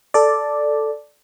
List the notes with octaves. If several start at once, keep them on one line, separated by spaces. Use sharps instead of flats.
A4 D5